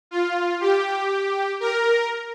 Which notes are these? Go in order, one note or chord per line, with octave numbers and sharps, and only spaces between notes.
F4
G4
A#4